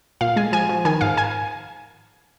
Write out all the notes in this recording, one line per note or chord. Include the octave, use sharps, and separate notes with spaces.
A#2 F5
G#3 G#5
F3 G#5
F3
D#3 G#5
G#2 F5
G#5